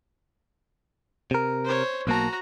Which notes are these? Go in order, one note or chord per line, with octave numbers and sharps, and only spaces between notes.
C3 A#4
C5 C#5
B1 A#3 F#4 A5 A#5